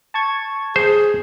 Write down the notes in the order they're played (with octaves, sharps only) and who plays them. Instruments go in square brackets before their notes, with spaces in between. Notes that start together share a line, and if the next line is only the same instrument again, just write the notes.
[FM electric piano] A5 C#6 G#6
[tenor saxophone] G#4 [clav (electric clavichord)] C5